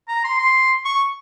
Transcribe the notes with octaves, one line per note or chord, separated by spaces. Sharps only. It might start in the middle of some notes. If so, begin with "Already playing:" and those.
A#5
C6
C6
C#6